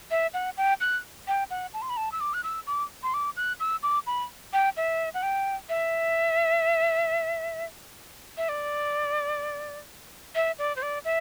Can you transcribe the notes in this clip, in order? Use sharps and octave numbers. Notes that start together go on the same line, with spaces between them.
E5
F#5
G5
F#6
G5
F#5
A5
C6
B5
A5
E6
D6
F#6
E6
D6
C6
D6
F#6
E6
D6
B5
G5
E5
F#5
G5
E5
E5
D5
E5
D5
C5
D5
E5